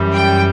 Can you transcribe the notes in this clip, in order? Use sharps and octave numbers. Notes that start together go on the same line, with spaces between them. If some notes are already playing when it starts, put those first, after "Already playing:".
Already playing: F#2 E3 G3
G5